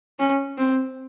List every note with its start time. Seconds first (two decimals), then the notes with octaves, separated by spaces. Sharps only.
0.19 C#4
0.58 C4